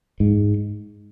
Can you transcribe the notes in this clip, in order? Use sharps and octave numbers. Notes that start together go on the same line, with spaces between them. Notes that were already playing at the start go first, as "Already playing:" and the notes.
G#2